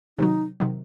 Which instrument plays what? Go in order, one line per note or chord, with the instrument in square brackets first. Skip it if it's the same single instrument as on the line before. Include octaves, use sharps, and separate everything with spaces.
[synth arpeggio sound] C3 D#3 F#3 [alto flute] D#4
[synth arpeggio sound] C3 D#3 F#3